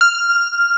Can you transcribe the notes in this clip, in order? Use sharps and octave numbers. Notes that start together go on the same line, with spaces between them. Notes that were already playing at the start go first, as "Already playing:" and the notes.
F6